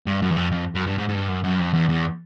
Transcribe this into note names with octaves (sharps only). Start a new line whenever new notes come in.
G2
F#2
E2
F2
F2
F#2
G2
G#2
G#2
G2
F#2
F#2
F2
E2
E2